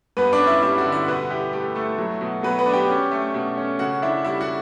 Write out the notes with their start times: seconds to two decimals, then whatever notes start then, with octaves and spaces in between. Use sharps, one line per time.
0.17 G2 B3 B4
0.33 D4 D5
0.39 C#4
0.47 E4 E5
0.63 G3 E4 E5
0.78 F#4 F#5
0.86 D3
0.92 E4 E5
1.07 B2 B3 B4
1.30 E4 G4
1.53 A3 G4
1.75 A3 E4 A4
1.98 F#3
2.21 B2
2.43 F#3 B3 B4
2.58 B3 B4
2.66 D4
2.73 G4 G5
2.88 C#4
3.11 A3
3.34 B2
3.58 C#4
3.79 C#3 F#4 F#5
4.02 D4 E4 E5
4.24 G3 E4 E5
4.41 F#4 F#5